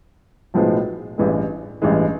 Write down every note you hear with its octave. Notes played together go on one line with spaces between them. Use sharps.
B1 A2 F3 G#3 B3
A1 G2 E3 G#3
A1 G2 E3 G#3